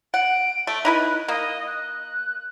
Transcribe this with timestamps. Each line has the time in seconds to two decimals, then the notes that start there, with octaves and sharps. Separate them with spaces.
0.14 F#5 D7
0.67 A3
0.85 D#4 E4 B4 F#6
1.28 A#3 D#5
1.67 F#6